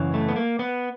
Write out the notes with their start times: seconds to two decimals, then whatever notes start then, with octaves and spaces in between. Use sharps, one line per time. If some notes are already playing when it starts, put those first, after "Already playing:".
Already playing: F#2 C#3 E3
0.14 A3
0.29 B3
0.36 A#3
0.59 B3